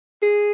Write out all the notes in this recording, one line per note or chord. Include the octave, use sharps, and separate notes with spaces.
G#4